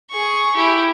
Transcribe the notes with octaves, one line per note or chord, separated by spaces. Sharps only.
G#4 C#6
E4 G4